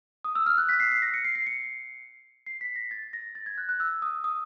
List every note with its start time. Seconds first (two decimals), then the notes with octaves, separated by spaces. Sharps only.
0.24 D#6
0.35 E6
0.46 F6
0.58 F#6
0.69 B6
0.80 C7
0.91 C7
1.02 A#6
1.14 C#7
1.25 C7
1.35 C7
1.47 C#7
2.46 C7
2.61 B6
2.76 A#6
2.91 A6
3.13 A#6
3.35 A6
3.46 G#6
3.58 F#6
3.69 F#6
3.80 E6
4.02 D#6
4.24 D#6